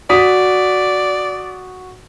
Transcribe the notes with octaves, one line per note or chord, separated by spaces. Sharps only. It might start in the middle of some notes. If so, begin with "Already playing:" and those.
F#4 D5 D#6 B6